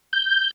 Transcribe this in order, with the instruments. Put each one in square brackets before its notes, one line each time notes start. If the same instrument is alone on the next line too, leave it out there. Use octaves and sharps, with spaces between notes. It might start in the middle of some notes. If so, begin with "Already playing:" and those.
[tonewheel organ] G6